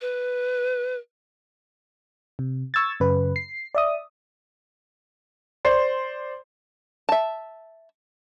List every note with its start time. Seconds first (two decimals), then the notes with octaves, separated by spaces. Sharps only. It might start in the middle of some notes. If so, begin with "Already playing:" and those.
0.01 B4
2.39 C3
2.74 C#6 E6 G#6 A6
3.00 F#2 C#3 B4
3.36 C7
3.75 D5 E5 D#6
5.65 C5 D5 C6
7.09 E5 A5